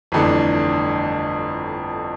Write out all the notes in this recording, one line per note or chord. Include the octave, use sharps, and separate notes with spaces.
G1 F2 E3 A3 D4